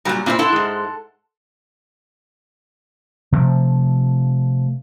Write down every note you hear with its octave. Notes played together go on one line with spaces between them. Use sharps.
A#2 F#3 G3 G#5 A#5
A#2 C4 E4 E5 F5 B5
E4 A4 F#5 C6
G#2 G#3
C3 F3 A3